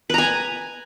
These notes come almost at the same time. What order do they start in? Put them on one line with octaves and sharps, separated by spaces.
B4 A#5 G#5